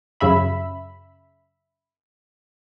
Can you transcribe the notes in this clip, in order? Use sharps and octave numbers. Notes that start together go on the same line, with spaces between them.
F#2 C#3 E5 B5